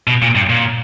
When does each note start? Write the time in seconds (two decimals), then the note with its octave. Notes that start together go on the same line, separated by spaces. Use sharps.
0.07 B2
0.22 A#2
0.35 G2
0.50 A#2